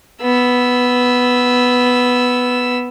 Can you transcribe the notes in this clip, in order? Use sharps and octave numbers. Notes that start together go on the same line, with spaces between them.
B3 E6